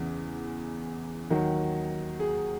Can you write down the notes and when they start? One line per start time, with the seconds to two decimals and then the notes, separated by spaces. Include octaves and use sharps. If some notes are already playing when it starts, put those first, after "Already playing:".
Already playing: E2 C#3 E3 G#4
1.30 D#2 D#3 F#3
2.20 G#4